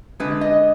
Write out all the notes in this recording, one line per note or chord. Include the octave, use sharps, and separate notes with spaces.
D3 G#3 B4
D#5